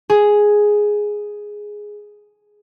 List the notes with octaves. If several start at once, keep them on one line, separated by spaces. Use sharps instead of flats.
G#4